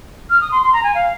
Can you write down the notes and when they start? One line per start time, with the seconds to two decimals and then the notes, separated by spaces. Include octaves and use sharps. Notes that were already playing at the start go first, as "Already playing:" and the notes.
0.30 F6
0.41 D#6
0.52 C6
0.62 C6
0.73 A#5
0.84 G#5
0.95 F5